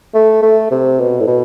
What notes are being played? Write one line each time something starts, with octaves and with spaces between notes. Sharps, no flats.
A3
A3
C3
B2
A2
B2